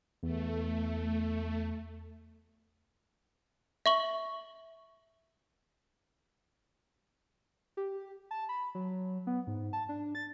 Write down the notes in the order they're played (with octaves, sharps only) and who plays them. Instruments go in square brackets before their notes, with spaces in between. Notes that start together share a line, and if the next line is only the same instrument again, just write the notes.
[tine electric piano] E2 [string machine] A3
[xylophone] E5 C#6 F#7
[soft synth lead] G4
A5
B5
F#3
B3
G#2
A5
D4
A6